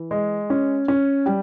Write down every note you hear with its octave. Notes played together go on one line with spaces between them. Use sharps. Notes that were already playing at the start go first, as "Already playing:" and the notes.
Already playing: E3
G#3
C#4
C#4
G3